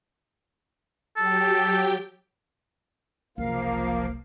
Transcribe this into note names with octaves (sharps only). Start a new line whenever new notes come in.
F#3 G4 A4 G5
F#1 C2 F3 A#3 A#4 F5